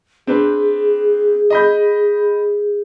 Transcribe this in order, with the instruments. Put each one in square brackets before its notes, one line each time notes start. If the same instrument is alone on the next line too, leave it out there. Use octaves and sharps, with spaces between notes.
[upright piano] C4 D4 B4 [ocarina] G#4
[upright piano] D#5 B5 G6